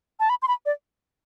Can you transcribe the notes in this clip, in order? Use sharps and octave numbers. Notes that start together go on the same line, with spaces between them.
A5
B5
C6
B5
D5